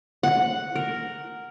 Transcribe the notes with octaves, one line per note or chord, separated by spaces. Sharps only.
F#5
A#4